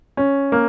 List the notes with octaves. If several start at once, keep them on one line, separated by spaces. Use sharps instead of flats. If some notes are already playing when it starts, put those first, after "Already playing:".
C#4
A#3